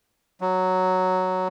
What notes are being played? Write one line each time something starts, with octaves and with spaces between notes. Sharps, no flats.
F#3